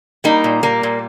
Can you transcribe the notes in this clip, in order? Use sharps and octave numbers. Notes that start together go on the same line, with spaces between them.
G3 A#3 D#4
A#2
G3 A#3
A#2